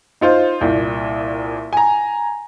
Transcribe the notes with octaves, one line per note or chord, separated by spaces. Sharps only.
D#4 F4 C5
C2 A#2
G#5 A#5